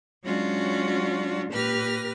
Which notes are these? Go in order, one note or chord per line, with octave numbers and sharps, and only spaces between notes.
F#3 G#3 C#4 D4 F4 F#4
A#2 G4 B4 F6 A#6